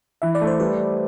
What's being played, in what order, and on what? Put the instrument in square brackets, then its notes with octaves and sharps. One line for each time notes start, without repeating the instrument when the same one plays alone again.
[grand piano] E3 [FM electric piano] E5
[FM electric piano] D5
[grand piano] A3
[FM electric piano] C5
[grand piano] G3 [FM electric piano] B4